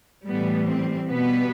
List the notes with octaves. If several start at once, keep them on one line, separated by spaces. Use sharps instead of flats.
A2 E3 G3 B3
C4
B2 G3 B3 B4